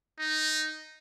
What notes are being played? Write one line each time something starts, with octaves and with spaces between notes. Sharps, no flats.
D#4